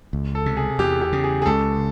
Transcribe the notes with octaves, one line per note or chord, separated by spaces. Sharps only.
C#2
A4
C3
G#4
E2 G4
G4
C#3
G#4
G#4
C#2 A4